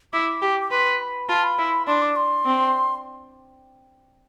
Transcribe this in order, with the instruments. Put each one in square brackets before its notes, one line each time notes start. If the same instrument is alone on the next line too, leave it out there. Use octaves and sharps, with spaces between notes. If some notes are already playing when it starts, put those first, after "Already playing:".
[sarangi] E4 [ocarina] D6
[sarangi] G4
[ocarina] D6
[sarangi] B4 [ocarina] C6
[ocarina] B5
[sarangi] F4 [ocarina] A5
[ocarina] B5
[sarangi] E4
[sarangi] D4 [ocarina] C6
[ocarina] D6
C6
[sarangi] C4